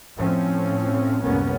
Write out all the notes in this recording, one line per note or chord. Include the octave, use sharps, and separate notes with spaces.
A2 F3 C4 C#4
F#1 C2 A2 A#3 B3 C#4